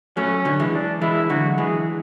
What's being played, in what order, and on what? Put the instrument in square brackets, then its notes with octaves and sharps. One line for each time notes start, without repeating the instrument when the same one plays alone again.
[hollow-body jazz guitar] F#3 A3 [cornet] C#4
[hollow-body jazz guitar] D3 F#3
E3 G#3
[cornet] D4
[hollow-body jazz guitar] E3 G#3 [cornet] E4
[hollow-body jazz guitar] D3 F#3 [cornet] F#4
[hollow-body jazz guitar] E3 G#3 [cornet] G#4